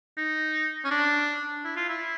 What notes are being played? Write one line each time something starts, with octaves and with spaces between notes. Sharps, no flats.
D#4
C#4
D4
E4
F4
E4